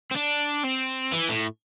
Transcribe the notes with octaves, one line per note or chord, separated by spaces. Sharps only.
C4
D4
C4
E3
A2